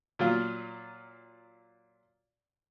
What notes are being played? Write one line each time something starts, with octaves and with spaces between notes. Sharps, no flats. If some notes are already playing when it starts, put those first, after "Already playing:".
A#2 F#3 F4